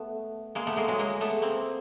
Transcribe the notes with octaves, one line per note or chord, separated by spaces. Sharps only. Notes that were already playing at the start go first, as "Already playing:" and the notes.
Already playing: A3 B3
G#3 A#3
A3 B3
G#3 A#3
F#3 G#3
G#3 A#3
A3 B3
A#3 C4